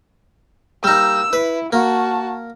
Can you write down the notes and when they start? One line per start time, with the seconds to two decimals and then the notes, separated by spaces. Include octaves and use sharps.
0.84 G3 A#3 D#4 E6
1.33 E4 B4
1.73 A#3 F#4 A5